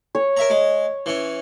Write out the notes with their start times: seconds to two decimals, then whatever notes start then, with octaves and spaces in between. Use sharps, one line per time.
0.15 C#5
0.37 A#4 E5 A#5
0.50 G#3
1.06 E3 C#4